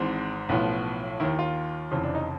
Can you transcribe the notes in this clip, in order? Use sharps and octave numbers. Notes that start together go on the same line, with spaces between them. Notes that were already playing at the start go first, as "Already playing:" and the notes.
Already playing: G#1 G#2 E3 C4
B1 A2 F3 B3
D#2 D#3 E4
F4
F1 F2 C#3 E3
D4
D#4